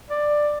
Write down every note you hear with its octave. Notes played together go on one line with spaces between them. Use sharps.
D5